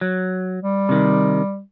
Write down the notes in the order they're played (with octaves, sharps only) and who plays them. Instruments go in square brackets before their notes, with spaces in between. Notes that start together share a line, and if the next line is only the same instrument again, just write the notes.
[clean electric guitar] F#3
[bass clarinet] G3
[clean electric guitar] C3 D#3